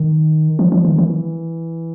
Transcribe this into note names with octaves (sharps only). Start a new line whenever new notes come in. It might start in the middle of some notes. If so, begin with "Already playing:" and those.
Already playing: D#3
F3
F3
D#3
E3